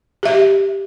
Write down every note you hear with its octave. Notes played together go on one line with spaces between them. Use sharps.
G4 E5